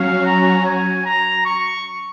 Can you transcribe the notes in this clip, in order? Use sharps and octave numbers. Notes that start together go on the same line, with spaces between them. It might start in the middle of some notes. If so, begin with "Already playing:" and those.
Already playing: F#3 C#4 F#4 F5
A#5
G#5
A#5
C#6